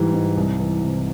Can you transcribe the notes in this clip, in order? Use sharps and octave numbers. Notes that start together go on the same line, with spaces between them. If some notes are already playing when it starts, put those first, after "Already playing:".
Already playing: G#2 E3 G3
G#2
C2
E3
C3